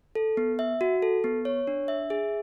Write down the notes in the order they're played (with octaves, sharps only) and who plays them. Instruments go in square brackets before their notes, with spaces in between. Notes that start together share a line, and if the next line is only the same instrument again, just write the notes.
[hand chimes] A4
B3
E5
F#4
A4
B3
C#5
D4
E5
G#4